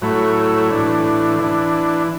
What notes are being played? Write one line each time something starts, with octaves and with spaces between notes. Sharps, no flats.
A2 F#3 A3 E4
A2 E3 D4
E3 D4